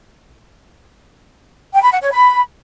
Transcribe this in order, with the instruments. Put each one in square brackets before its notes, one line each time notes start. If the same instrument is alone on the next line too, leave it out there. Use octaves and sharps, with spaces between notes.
[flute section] G5
B5
F#5
C#5
B5